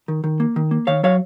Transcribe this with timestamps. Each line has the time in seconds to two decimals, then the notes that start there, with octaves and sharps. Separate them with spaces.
0.08 D#3
0.24 D#3
0.40 A#3
0.56 D#3
0.71 A#3
0.87 D#3 C#5 F5
1.03 F#3 C#5 F5